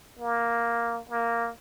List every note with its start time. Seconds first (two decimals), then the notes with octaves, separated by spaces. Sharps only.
0.19 A#3
1.09 A#3